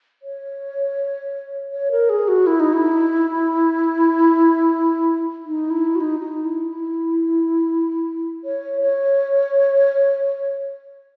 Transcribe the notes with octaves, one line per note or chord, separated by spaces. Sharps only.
C#5
C#5
A#4
G#4
F#4
E4
D#4
E4
D#4
E4
F#4
D#4
D#4
E4
E4
C#5
C#5